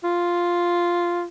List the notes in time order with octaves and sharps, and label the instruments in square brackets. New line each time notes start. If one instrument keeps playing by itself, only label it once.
[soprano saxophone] F4